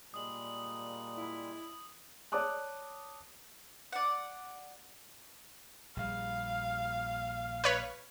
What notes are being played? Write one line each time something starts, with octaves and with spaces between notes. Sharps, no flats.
A#2 G3 G#3 D#6 F#7
E4
C#5 D5 A5 D6 D#6 F#6
D5 F#5
A#1 G3 F5
B4 C#5 B5